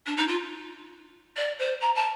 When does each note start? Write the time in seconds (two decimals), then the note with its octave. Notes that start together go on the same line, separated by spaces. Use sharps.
0.06 D4
0.17 D#4
0.27 F4
1.37 D5
1.59 C5
1.80 A#5
1.95 A5